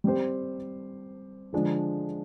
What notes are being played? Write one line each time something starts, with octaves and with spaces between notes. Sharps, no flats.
G3 C4 G4 C5
D3 F3 G#3 D4